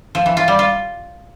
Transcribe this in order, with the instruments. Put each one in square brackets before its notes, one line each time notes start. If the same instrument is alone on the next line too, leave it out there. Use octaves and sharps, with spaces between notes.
[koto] F3
E3
F4
G3
F4